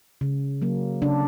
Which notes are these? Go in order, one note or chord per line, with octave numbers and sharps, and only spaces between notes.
C#3
F#3 A#3
C#3 D4